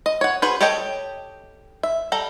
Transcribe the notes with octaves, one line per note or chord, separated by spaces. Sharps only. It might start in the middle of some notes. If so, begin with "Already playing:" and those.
D#5
C#5 F#5
F#4 G#4 B4 C5
G4 A4 C#5 D#5 G5
E5
G3 A4 A#5